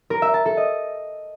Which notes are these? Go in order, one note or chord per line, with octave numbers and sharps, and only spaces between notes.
A#4
E5
A5
A4
D#5